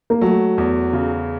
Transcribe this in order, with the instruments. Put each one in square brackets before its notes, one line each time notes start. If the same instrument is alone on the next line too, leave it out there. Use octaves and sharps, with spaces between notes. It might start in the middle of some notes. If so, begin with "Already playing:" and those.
[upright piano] A#3
[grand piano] F#3 [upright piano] A3
[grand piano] E2
C#3